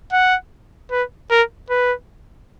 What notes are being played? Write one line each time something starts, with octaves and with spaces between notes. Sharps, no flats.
F#5
B4
A#4
B4